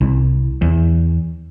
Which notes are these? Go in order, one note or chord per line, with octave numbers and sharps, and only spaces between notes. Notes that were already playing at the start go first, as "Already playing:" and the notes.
C2
E2